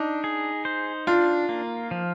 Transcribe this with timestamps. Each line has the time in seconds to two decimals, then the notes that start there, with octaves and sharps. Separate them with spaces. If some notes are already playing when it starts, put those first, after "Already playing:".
Already playing: D4 D#4
0.24 G#4
0.65 C5
1.07 D4 F4
1.49 A#3
1.91 F3